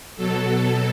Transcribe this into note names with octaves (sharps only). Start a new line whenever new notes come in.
B2 F#3 A4
B2 F#3